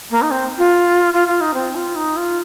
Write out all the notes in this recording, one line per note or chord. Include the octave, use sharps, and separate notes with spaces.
A#3
D#4
C4
F4
F4
F4
D#4
C4
F4
D#4
F4